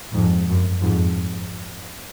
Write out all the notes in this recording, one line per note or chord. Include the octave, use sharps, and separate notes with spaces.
F2 G#2
F#2
F2 G#2